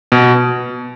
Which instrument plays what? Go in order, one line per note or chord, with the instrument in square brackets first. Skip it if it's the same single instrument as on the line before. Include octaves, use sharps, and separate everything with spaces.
[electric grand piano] B2